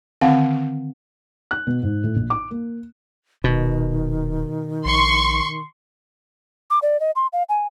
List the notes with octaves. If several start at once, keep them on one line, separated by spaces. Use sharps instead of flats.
D3 D#3 C4 F5 F#5
F#6
B2
G#2
A2
A#1
D6
A#3
D#1 B2 D#3
A#1 C6 C#6
D6
D5
D#5
C6
F5
G#5